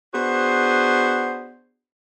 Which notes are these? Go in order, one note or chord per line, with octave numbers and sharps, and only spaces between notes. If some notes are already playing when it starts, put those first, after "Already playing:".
B3 D4 F#4 G#4 C5